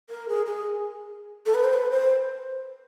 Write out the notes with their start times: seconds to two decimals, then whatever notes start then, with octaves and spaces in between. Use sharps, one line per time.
0.10 A#4
0.29 G#4
0.46 G#4
1.46 A4
1.54 B4
1.64 C5
1.73 B4
1.91 C5